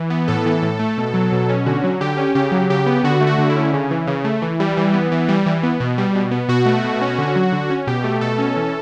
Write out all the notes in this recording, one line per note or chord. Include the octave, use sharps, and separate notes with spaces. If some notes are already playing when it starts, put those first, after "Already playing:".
Already playing: E3
B3
A2 A4
E3
A2
A3
B2
F#3
B2
C#4
D3 F#4
F#3
D3 G4
C#4
C#3 G4
F#3
C#3 G4
B3
D3 F#4
A3
F#4
D3
E4
C#4
C#3
E3
C#3
A3
E3
G3
E3
B3
E3
G3
E3
B3
B2
G3
B2
B3
B2 F#4
A3
B2
C#4
D3
F#3
D3
C#4
B2 G4
A3
B2 A4
C#4
E3